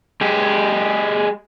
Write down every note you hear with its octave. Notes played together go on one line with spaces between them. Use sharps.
G#3 G4